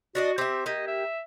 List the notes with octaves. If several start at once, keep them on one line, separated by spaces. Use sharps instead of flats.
D4 F#4 D5 D#5
C4 G4 E5
A#3 G4 D#5
E5